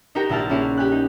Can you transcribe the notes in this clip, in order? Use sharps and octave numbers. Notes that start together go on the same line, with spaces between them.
D#4 F#4 G4 A#4 G5
A#1 E4 F#5 A5 F6
A#3 C#4 E4 G#4
G4 G#5 F#6
D#4